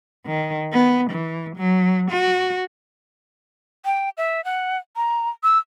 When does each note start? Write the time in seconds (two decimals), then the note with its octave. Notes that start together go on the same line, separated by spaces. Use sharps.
0.26 D#3
0.73 B3
1.11 E3
1.56 F#3
2.11 F#4
3.85 G5
4.17 E5
4.45 F#5
4.96 A#5
5.43 E6